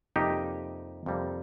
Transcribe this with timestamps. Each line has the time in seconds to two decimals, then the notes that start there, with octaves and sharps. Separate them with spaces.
0.16 F2 C3 G3 A#3 D#4 G4
1.06 F2 C3 G3 A#3